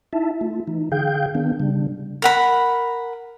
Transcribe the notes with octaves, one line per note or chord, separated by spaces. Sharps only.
D#4 E4 E5 A5
A3 F4
E3 D#4
D3 G#4 F5 G5 G6
D#3 B3 D4
C#3 G3 D4
A#4 F#5 B5